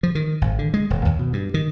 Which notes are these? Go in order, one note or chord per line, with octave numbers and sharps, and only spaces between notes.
F3
D#3
G#1
D3
G#3
D#1
D#2
B2
G2
D#3